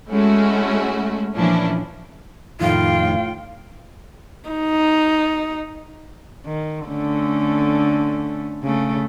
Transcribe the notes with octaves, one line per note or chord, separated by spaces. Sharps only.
G#3 A3 C#4 E4 F#4
A#2 E3 F3 C#4 D4 E4
F2 A2 D#3 F4 F5 G5
D#4
D#3
D3 A3 C#4
C#3 A3